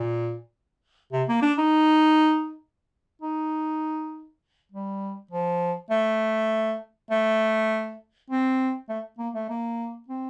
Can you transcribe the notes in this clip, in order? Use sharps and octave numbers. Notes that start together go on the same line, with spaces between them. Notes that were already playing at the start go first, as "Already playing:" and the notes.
Already playing: A#2
C3
A#3
D4
D#4
D#4
G3
F3
A3
A3
C4
A3
A#3
A3
A#3
C4